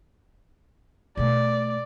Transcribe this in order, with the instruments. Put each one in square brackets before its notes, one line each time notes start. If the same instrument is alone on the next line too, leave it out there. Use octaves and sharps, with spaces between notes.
[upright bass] B2 A3 [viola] D5